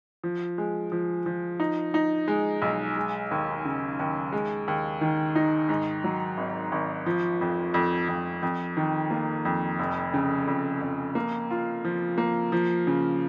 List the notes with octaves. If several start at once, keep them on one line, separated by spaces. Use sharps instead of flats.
F3
G#3
F3
F3
D#4
D#4
G#3
B1
G#3
D#2
C#3
D#2
G#3
D#2
D#3
D#4
G#2
F#3
G#1
G#1
F3
F2
F2
F2
F2
D#3
A#3
F2
F1
C#3
F2
F2
A#3
F4
F3
A#3
F3
C#3